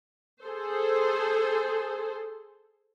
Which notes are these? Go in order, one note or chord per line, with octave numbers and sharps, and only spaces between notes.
G#4 A4 C5